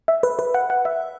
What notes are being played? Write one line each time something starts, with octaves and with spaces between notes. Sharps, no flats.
E5
B4
B4
F#5
F#5
E5